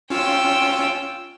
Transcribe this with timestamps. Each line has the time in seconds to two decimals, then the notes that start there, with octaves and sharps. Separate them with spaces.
0.10 C#4 F4 G5 E6